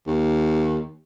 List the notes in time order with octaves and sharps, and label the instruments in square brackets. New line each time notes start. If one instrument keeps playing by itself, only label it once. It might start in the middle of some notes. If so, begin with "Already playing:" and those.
[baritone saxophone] D#2